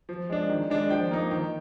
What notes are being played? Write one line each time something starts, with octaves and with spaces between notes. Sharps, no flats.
F3
G#3 D4
D#3
G#3 D4
F3 G5
A#3 D#4
D#3